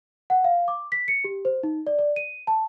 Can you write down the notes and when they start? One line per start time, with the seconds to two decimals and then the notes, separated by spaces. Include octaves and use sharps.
0.30 F#5
0.44 F5
0.68 D6
0.92 B6
1.08 C#7
1.24 G4
1.45 C5
1.63 D#4
1.87 D5
1.99 D5
2.16 D#7
2.47 A5